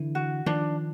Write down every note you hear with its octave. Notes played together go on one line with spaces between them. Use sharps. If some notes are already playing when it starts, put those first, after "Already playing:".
Already playing: D3 E3
F#4
D#3 F3 D4